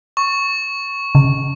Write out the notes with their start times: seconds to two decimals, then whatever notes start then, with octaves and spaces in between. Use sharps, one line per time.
0.17 C#6
1.15 C#3